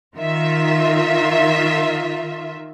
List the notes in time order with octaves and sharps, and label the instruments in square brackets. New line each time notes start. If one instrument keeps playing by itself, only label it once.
[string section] D#3 F4 E5